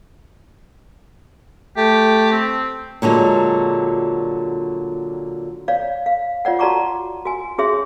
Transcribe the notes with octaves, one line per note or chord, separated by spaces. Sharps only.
A3 G4
C4
A#2 D3 F#3 G#3
C#5 D5 F5
F5
F4 C#5 D5 F#5
F#4 D5 A5 A#5 C#6 D6
F#4 G#5
C#4 F#4 G#4 C#5 E5 C6